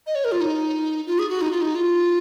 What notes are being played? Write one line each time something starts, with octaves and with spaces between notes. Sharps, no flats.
D#5
C#5
A#4
F4
D#4
F4
G#4
F#4
D#4
F4
D#4
F4